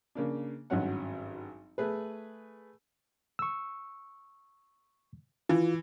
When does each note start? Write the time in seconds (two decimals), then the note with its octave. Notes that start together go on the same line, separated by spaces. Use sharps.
0.15 C#3 A#3 D4
0.70 G#1 G2 F#3 C#4 F#5
1.78 A3 G#4 B4
3.39 C#6 E6
5.49 E3 F4